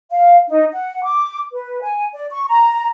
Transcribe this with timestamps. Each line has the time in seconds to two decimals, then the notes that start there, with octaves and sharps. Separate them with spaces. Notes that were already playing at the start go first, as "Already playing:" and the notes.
0.12 F5
0.49 D#4
0.73 F#5
1.04 D6
1.52 B4
1.82 G#5
2.13 D5
2.31 C#6
2.47 A#5